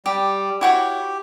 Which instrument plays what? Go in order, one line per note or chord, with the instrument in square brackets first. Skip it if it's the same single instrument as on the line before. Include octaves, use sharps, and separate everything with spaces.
[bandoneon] G3 [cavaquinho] G4
[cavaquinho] E4 F#4 C#5 [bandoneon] G4